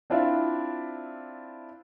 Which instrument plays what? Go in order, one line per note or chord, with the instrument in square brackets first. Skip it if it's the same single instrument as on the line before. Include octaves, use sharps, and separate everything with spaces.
[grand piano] C4 D4 E4 F4 D5 E5